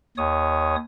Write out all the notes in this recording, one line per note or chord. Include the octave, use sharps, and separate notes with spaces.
D#2 C#5 D#6